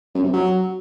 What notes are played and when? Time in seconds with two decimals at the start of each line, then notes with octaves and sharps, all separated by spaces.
0.15 F#2
0.24 C3
0.33 F#3